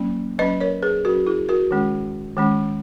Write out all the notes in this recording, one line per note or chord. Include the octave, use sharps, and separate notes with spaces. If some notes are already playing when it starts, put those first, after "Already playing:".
Already playing: F#3 A#3 C#4
F#3 C#4 B4 D#5
A#4 C#5
G#4 B4
F#3 C#4 F#4 A#4
E4 G#4
F#4 A#4
D#3 G#3 C#4
D#3 G#3 C#4